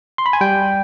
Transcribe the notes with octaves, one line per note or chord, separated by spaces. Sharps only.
C6
B5
G#5
G3 G5